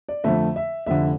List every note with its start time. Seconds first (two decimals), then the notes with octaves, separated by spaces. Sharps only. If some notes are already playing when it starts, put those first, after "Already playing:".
0.09 D5
0.24 F2 D3 A3 E5
0.56 E5
0.86 F1 F2 D3 E5